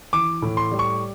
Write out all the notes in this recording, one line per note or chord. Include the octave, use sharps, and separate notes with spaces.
E3 D6
A2
C6
G3
C#6